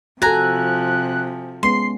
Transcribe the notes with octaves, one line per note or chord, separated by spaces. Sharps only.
C3 F3 F#4 A4 G#5 A#5 F#6
G#3 B3 C#4 C6 C7